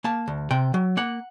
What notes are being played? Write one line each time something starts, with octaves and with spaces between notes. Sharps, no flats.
A#3 A5
D2
C3 G5
F#3
A#3 F#5